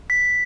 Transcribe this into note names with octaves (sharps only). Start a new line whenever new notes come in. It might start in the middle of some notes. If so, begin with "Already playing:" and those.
B6